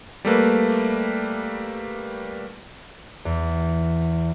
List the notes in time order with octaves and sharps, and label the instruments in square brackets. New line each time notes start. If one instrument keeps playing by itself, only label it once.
[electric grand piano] G3 A3 A#3 B4
[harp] E2